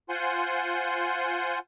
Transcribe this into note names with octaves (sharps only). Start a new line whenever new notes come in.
F4 C5 F#5 G#5 C6